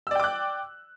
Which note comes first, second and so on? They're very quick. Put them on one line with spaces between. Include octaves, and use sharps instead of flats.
E6 D5 G5 D6 F#6